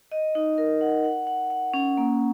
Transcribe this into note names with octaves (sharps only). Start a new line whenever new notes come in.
D#5
D#4
A#4
F#5
F#5
F#5
F#5
C#4
A#3